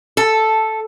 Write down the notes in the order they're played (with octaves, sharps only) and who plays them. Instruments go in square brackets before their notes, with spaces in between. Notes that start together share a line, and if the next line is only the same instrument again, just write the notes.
[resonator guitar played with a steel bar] A4